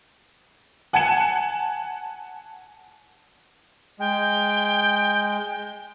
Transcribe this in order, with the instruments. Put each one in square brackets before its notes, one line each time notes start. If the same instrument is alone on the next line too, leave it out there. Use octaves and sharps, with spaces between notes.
[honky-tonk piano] F#5 G#5 A5 G#6 C#7 E7
[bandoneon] G#3 [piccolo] G5